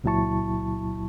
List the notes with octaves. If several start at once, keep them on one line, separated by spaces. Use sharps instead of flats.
C#2 A#2 F#3 E4 A5 C#6